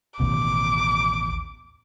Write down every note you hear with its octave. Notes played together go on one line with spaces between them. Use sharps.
A1 D#2 B2 D6